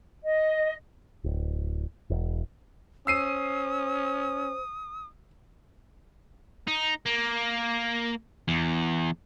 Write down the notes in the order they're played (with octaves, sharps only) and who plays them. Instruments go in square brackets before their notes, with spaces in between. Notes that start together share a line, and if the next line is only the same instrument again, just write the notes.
[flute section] D#5
[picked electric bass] D1
E1
[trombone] C#4 [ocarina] C5 [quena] D#6 [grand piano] E6 C7 D#7
[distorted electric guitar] D#4
A#3
E2